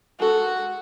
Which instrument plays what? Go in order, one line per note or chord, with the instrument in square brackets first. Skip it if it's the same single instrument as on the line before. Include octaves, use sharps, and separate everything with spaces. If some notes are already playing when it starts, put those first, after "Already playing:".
[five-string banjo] G#3 A4 [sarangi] F#4